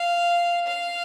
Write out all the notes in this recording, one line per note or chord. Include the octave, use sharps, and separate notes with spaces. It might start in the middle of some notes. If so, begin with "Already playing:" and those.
Already playing: F5
F5